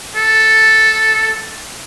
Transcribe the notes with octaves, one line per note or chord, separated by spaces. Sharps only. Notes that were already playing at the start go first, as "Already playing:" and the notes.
A4